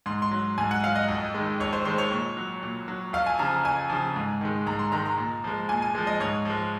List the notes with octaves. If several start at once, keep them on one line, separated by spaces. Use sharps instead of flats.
G#2 C6
C6
F#3
G#2 G#5
F#5
F#3 F5
D#5
F2
D#3 G#3
F2 C#5
C5
D#3 G#3 C5
C#5
A#2
F#3
A#2
F#3
F2 F5
G#5
C#3 F3 A#5
F2 G#5
C#3 F3
G#2
D#3 G#3
G#2 A#5
C6
D#3 G#3 A#5
A#5
A#2
F3 G#3
A#2 G#5
G#5
F3 G#3
D#5
G#2 C#5
F3 G#3